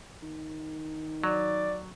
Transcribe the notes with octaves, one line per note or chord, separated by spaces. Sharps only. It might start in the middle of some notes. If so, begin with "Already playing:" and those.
D#3
F#3 D5